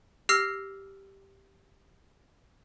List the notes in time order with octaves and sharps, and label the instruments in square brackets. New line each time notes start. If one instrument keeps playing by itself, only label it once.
[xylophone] G4 E6 F6 A#6 C7